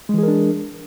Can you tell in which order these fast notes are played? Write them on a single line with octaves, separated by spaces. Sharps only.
G#3 E3 G#4 A#4 D4